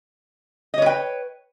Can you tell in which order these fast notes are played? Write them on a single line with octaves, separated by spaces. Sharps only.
D#5 C#5 B4 G5